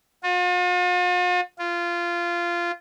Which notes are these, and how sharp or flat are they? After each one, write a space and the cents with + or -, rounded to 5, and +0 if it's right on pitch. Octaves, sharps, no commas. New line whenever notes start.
F4 +45
F4 -15